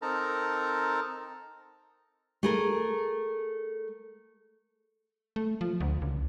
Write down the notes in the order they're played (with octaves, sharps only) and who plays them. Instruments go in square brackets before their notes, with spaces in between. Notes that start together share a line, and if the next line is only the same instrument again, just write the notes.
[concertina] C4 D#4 A4 A#4 A5 A#5
[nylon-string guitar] A3 G#4 A#4
[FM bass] A3
F3
D2
C#2